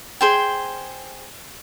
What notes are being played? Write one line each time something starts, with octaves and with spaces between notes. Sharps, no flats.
G#4 C5 G5